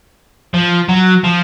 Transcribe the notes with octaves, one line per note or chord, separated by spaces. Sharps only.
F3
F#3
F3